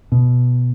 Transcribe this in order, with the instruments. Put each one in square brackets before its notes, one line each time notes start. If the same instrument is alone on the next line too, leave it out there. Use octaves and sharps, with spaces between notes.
[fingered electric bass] B2